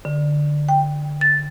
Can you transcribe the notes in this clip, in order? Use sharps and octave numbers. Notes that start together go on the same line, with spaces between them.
D3
G5
A6